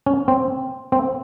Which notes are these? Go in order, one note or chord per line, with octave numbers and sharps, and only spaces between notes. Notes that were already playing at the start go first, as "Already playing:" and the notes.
C#4
C4
C4